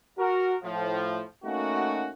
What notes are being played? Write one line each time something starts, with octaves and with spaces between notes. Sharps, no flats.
F#4 A#4
A2 F3
A3 A#3 C#4 D#4 F#4